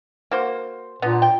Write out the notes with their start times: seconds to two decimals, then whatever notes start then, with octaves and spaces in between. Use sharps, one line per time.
0.31 A#3 F#4 C5
1.02 A#2 D3 B3
1.22 G5